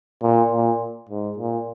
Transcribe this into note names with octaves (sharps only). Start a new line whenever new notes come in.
A#2
A#2
G#2
A#2